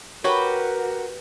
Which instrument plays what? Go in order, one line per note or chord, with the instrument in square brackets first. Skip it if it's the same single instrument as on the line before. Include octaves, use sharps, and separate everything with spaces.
[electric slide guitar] F#4 [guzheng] G4 B4 G5 [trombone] A#4 [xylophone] C#5 C#6